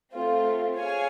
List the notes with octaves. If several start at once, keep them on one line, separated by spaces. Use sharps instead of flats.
A3 C4 F4
G#4 C#5 F5 G#5